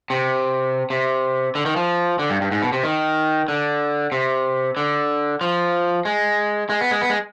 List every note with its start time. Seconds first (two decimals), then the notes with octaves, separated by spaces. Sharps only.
0.10 C3
0.90 C3
1.55 D3
1.66 D#3
1.76 F3
2.19 D3
2.30 G2
2.41 G2
2.51 G#2
2.62 B2
2.72 C3
2.84 D#3
3.48 D3
4.12 C3
4.77 D3
5.41 F3
6.05 G#3
6.70 G#3
6.81 B3
6.91 G#3
7.01 B3
7.10 G#3